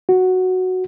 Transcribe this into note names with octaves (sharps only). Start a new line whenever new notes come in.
F#4